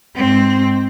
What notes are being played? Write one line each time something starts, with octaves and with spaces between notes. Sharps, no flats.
G#2 C4